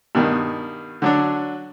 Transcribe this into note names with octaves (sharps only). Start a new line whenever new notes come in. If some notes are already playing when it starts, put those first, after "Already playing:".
G2 B2 D#3
D3 F#3 D4